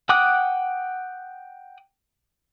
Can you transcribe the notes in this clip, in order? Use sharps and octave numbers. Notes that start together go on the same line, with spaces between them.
F#5 G5 D6 D#6 F#6